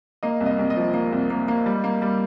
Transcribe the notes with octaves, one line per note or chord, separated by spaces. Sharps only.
A#3 D#5
C2
D#5
C2
D#5
F3
A#3
C2
A#3
A#3
G3
A#3
G3